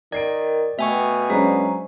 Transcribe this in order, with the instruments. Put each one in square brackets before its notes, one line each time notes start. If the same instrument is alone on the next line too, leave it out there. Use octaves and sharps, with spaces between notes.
[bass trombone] D#3 [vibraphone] A#4 [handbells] D5 [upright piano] G#6 C7 D7
[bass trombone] B2 [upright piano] A3 [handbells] E5 G#5 C#6 [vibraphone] G5
[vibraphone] F#3 C5 A#5 [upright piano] G#3 C#4 D4